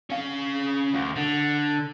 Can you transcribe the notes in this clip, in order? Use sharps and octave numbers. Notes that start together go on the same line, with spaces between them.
C#4 F5
D2
D3